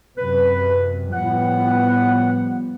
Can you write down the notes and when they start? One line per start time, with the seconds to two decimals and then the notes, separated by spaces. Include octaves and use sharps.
0.17 F#2 C3 B4
1.13 A2 F3 G3 B3 F#5